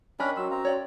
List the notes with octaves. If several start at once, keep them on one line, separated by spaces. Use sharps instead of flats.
C#4 D4 A#4 D#5 G5 G#5 B5
F#3 C#4 F#4 C6 E6
C4 F5 A#5
C#5 D5 G5